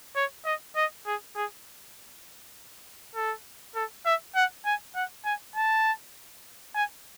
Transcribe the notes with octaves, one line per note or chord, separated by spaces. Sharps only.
C#5
D#5
D#5
G#4
G#4
A4
A4
E5
F#5
G#5
F#5
G#5
A5
G#5